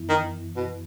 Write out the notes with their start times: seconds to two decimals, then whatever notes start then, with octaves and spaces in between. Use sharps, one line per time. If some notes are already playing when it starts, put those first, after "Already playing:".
Already playing: F#2 E3 B3 E4
0.09 D#3
0.56 B2